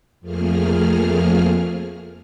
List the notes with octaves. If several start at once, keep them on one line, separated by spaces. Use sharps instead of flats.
F2 F3 A3 A#3 G#4 F6